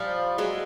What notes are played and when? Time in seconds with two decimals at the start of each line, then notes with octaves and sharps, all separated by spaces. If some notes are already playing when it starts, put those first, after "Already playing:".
Already playing: F3 G3
0.38 F#3 G#3